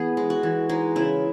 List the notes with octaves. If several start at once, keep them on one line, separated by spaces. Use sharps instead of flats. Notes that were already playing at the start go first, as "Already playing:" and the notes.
Already playing: E3 B3 G#4
G#3
F#4
E3
G#3 D#4
C#3 E4